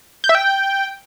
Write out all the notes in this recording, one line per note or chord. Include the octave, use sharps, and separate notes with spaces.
G6
E5
G5